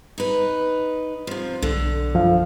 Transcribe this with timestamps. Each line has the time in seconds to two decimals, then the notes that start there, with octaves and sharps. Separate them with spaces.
0.18 D#4 B4
1.27 C3 F3
1.62 B1 D3
2.14 F#2 F3 F5